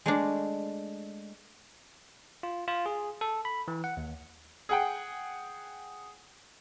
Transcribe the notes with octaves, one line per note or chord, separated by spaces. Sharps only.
G#3 A3 D4
F4
F4
G#4
A4
B5
E3
F#5
D#2
G#4 F#5 G5